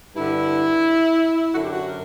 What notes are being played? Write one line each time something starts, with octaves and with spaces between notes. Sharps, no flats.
G2 D3 E4
F#2 D3 F#4
G4
F#4
A#4